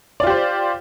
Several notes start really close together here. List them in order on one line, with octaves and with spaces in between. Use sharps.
D5 F4 G4 C5